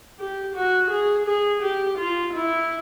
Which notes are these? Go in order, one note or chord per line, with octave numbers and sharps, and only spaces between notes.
G4
F#4
G#4
G#4
G4
F4
E4